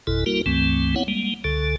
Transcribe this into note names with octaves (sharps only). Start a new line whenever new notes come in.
G#1 F2 B2 E4 A4
G3 A#3 E4 F#4 A#4
C#2 G2 E3 A3 C4
B3 C4 E4 C#5 F#5
G3 G#3 A#3
C#2 D3 A4